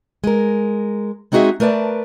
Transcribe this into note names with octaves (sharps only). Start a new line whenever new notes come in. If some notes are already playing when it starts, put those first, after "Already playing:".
G#3 A#4
G#3 C4 D#4 F#4 G#4 E5
A3 A#4 B4 D5 A5